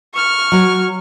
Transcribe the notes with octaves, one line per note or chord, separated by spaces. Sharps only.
C#6 F6
F#3 C#5